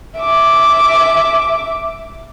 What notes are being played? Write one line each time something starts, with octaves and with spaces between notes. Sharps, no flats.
E5 D6